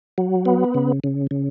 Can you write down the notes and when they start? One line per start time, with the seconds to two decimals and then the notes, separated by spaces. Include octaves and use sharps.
0.18 F#3
0.45 B3
0.74 C#3
1.04 C#3
1.31 C#3